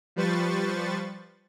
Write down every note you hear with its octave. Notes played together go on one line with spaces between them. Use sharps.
F3 G3 B4 C5 C#6 A6